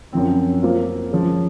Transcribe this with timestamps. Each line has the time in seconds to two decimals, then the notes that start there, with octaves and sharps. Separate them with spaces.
0.13 F#2 F3 C4
0.62 A#3 F4 C5 F5
1.11 F3 G#3 C#4 G#4